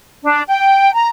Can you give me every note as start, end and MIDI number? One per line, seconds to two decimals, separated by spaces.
0.24 0.42 62
0.48 0.91 79
0.94 1.08 82